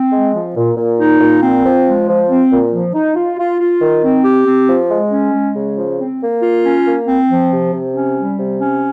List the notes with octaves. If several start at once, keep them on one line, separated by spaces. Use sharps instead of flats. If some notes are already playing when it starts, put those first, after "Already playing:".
Already playing: C4
G#3
F3
A#2
A#2
D#4
A#2
C4
F3
G#3
F3
C4
A#2
F3
D#4
F4
F4
F4
D#3
C4
G4
C4
F3
G#3
C#4
G#3
C#3
F3
C4
A#3
F4
C#4
A#3
C4
F3
C3
C3
C#4
G3
C3
C#4